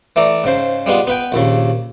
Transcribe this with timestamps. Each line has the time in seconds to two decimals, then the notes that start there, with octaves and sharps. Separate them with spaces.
0.16 E3 A3 D5 A#5
0.44 G#2 C#3 C5
0.86 G3 G#3 B3 F4
1.07 B3 B4 G5
1.32 A#1 D#2 C#3